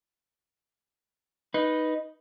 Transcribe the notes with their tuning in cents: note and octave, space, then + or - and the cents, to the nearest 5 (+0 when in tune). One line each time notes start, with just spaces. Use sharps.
D#4 +0 B4 -5